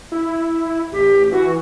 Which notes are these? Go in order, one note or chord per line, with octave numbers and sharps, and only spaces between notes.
E4
A1 G4
E3 F#4